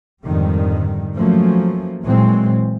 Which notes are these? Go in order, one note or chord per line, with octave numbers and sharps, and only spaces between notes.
F2 G#2 D3 D#3 G3
F3 F#3 A3 A#3 C#4
A#2 E3 F#3 G#3 C4